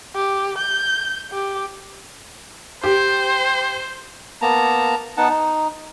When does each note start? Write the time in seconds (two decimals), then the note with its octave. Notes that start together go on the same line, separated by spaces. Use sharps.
0.15 G4
0.58 G6
1.32 G4
2.84 G4 C5
4.42 A#3 B3 A5 A#5
5.17 B3 D#4 F#5 A5
5.29 D#4